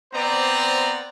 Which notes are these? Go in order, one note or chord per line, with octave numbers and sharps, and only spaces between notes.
B3 C4 C5 D5 A#5